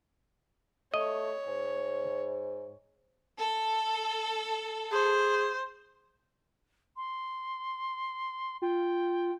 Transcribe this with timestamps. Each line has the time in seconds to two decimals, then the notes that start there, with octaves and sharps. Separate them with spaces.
0.94 A3 C#5 D#5
1.47 G#2
3.39 A4
4.92 G#4 C5
6.96 C6
8.62 F4 G5